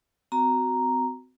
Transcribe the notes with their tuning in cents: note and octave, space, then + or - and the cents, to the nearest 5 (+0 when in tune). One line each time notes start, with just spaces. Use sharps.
C4 -35 F#4 +0 A#5 +0